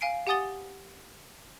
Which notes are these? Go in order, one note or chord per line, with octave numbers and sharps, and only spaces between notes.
F5 G#5 C7 D7
G4 F#5 G#5 D#6 A6 G7